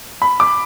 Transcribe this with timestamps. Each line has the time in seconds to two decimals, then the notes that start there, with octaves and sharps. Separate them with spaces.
0.22 B5
0.40 D6